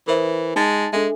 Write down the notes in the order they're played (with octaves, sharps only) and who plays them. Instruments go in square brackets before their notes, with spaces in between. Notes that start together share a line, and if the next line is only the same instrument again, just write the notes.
[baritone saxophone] E3 [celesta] A#4 C5 E5
[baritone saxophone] G#3 [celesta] D#4 A5 A6
[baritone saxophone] G#3 [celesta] D4 A4 E5